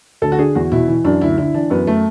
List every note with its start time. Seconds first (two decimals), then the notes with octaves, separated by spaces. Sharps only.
0.22 D2 A4
0.32 F#4
0.38 D3 G#4
0.55 E2 F#4
0.72 B2 E4
0.88 E3
1.04 F#2 D4
1.21 D2 E4
1.38 D3 E4
1.54 E3 D4
1.70 F#2 B3
1.87 A3